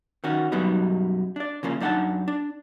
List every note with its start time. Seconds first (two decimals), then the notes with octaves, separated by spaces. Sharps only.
0.24 D#3 C#4 F#4
0.52 F#2 B2 F#3 G3 B3 D#4
1.36 D4 D5
1.63 C#3 F3 A#3 C#4
1.80 F#2 D4 D#4 F#5 G#5 A5
2.28 D4